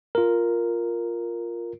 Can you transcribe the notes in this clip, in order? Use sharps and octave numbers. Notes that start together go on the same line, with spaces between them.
F4 A#4